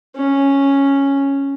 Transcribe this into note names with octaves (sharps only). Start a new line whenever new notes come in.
C#4